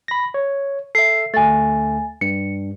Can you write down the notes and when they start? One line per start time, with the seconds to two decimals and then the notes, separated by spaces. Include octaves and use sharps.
0.08 B5 A#6
0.34 C#5
0.95 A4 E5 C7
1.34 D2 A3 G#5 A6
2.21 G2 C#7